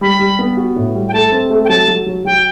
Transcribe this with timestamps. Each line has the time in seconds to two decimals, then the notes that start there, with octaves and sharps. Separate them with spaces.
0.01 G3 B5
0.19 G3
0.39 B3
0.57 F#4
0.76 A2
0.95 G3
1.08 G5
1.13 A3 A5
1.32 C4
1.50 A3
1.65 G5
1.69 F#3 A5
1.88 F#3
2.06 F#3
2.25 F#3 G5